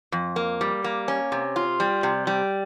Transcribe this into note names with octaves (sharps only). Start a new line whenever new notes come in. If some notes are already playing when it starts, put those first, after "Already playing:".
F2
A#3
G3
A#3
C#4
C3
F4
G3
C3
G3